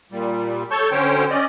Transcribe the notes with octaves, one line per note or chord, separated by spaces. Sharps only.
A#2 G3
A4 C#5 A5 C#6 G6
D3 F#3 C#4 C5 C#5 G5
C#4 D5 D#5